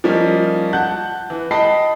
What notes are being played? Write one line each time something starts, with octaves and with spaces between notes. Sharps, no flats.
F3 G3 A#3 C#4 D#4
F#5 A5 F#6 G6
E3
D#5 G5 A5 B5 C7